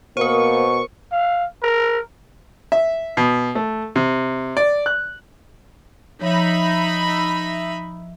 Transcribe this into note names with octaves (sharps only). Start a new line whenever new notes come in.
B2 A#3 A#4 C5 C#6
F5
A#4
E5
B2
A3
C3
D5
F#6
F3 D#4 C#5 E5 B5